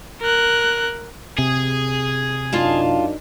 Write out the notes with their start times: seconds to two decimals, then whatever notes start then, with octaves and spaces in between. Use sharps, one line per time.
0.22 A#4 F#6
1.38 C3 G#4
2.52 F#2 D4 D#4 F4 F5 A5